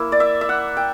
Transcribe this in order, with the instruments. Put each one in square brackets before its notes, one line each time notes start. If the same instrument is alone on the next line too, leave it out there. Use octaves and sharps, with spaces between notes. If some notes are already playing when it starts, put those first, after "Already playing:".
Already playing: [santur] A#3 E4
D5
E5
E5
F#5
G5